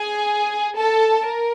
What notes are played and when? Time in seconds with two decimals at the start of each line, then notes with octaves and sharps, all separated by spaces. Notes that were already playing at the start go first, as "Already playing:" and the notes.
Already playing: G#4 G#5
0.77 A4 A5
1.24 A#4